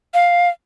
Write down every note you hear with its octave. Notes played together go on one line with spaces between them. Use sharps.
F5